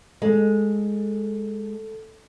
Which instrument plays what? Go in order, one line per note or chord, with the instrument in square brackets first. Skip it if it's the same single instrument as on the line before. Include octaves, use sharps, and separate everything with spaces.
[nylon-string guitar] G#3 [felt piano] A4